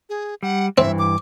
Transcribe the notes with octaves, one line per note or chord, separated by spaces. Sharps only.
G#4
G3 F#5
G2 E3 C4 E5
D6